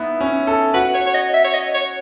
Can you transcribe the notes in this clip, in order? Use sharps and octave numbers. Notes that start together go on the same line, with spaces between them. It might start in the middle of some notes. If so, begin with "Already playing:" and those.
Already playing: B3 D#4 E4
C#4
A4
F#4 B4
C#5
C#5
D#5
E5
C#5
D#5
C#5